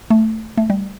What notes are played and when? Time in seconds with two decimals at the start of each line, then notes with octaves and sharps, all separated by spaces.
0.10 A3
0.58 A3
0.70 G3